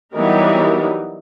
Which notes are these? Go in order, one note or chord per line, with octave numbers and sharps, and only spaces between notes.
E3 F#3 G3 B3 D#4 A#4